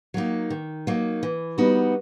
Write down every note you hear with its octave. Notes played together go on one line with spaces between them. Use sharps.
F#3 A#3 D#4
D#3
F#3 A#3 D#4
E3
G3 B3 D#4 F#4